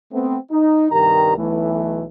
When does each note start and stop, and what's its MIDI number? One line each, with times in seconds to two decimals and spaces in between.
0.12 0.37 57
0.12 0.37 59
0.12 0.37 60
0.51 0.87 63
0.92 1.35 36
0.92 1.35 43
0.92 1.35 51
0.92 1.35 67
0.92 1.35 70
0.92 1.35 82
1.38 2.05 35
1.38 2.05 52
1.38 2.05 57